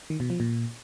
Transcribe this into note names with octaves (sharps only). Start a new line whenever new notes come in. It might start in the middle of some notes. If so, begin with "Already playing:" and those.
D#3
B2
F3
A#2